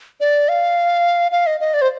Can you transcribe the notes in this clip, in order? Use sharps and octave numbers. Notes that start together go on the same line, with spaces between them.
D5
F5
F5
D#5
D#5
D5
C5